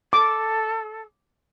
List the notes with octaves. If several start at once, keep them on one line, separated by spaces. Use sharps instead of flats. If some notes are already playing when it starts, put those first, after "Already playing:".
A4 D6